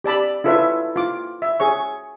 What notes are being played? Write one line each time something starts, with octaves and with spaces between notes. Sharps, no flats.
G4 D5 A5 B5
E4 F4 A4 B4 C#5 E5
F4 D6
E5
G#4 C#5 C#6